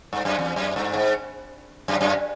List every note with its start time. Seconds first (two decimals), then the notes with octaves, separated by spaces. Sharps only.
0.13 G2
0.25 F#2
0.39 E2
0.56 F#2
0.76 G2
0.94 G#2
1.88 F#2
2.01 F#2